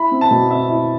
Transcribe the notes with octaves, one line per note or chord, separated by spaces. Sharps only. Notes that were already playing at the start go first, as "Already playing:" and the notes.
Already playing: E4 B5
C4
A5
B2
C4 E5
E4